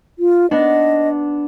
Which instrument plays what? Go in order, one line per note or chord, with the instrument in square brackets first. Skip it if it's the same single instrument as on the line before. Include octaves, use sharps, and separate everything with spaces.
[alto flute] F4
[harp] B3 D4 [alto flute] D#5